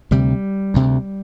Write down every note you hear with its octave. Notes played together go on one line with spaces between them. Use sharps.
D2 C3 G3
D2 C3